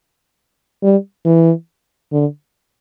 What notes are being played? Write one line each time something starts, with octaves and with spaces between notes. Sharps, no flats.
G3
E3
D3